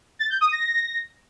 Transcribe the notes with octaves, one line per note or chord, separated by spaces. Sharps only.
A6
G6
D#6
A#6